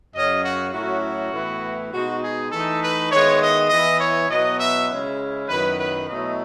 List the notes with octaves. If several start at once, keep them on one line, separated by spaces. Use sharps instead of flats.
F#2 C#3 F#3 C#4 D#5
F#4
A2 F#3 C#4 E4 F#4
F#4
A2 E3 B3 E4
B2 G#3 D#4 F#4
G#4
E3 A3 D#4 A4
B4
D#3 G#3 B3 E4 C#5
D#5
E3 B3 E4 D#5
C#5
B2 F#3 B3 E4 D#5
E5
C#3 G#3 C#4 E4
F#2 D#3 F#3 B3 E4 B4
B4
B2 F#3 A3 E4 D#5